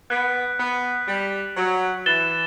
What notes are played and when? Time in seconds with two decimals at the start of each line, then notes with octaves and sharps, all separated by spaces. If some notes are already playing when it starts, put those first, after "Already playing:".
0.10 B3 F#6 B6 D7
0.60 B3
1.08 G3
1.57 F#3
2.06 E3 A6 E7 G7